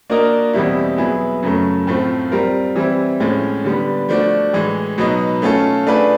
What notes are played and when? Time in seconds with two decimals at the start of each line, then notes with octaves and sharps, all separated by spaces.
0.10 A#3 D4 F#4 A#4 D#5
0.53 E2 B2 G3 C4 E4
0.98 F#3 B3 E4 G#4
1.42 F#2 C#3 F#3 A3
1.87 A2 F3 A3 C4 F4
2.31 G3 C4 F4 A#4
2.75 E3 G3 C4 E4
3.20 A2 F3 G#3 C#4
3.65 D3 G3 B3
4.09 F3 A3 D4 F#4
4.53 A2 E3 G#3
4.98 B2 F#3 B3 D#4
5.42 A3 C#4 F4 A4
5.86 A3 D4 F4 G#4 B4